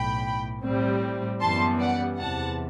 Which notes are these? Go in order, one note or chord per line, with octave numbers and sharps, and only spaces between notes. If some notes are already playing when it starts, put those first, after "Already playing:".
Already playing: B1 A2 E3 G5 B5
A2 G3 C4
F#2 E3 G3 B3 A5 C6
D5 F#5
E2 C3 E3 F#5 A5